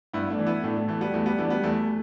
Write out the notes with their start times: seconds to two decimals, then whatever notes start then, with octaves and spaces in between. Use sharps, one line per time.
0.13 G2 B3 E4
0.30 A3 D4
0.39 E3
0.46 B3 E4
0.63 A2 A3 D4
0.76 A3
0.88 E3 A3
1.01 G3 B3
1.14 E2 A3
1.26 G3 B3
1.38 E3 A3 D4
1.50 G3 B3
1.63 E2 A3